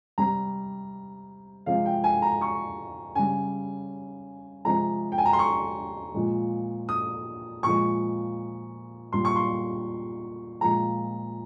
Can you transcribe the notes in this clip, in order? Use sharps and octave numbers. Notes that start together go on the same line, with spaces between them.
C3 G3 A#5
C3 F3 G#3 F5
G5
G#5
A#5
C#6
C#3 G3 G#5
C3 F3 G#3 A#5
G5
G#5
A#5
C6
C#6
A#2 F3 G#3
D#6
A#2 F3 G#3 C#6
A#2 G3 C6
C#6
C6
A#2 F3 G#3 A#5